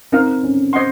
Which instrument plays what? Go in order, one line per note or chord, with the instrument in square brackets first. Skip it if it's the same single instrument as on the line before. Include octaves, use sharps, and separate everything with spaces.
[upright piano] C4 [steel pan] D#4 A#4 F5
[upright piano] C#4
[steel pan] C5 D#5 F#5 C6